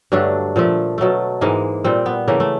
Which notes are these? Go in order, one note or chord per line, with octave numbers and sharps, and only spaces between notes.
G2 D3 F#3 A3 D4
A#2 F3 A3
B2 F#3 A3
G#2 E3 G#3 A#3
A#2 G3 C4
B3
C#3 E3 A3 A#3
A3